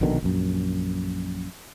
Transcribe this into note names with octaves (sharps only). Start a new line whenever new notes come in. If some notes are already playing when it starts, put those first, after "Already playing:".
A#1 B2 D3 D#3
A#1 F#2